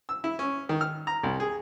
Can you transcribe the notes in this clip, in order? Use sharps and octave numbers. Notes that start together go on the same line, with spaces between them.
E6
E4
C#4
D#3
F6
A#5
C2
G#4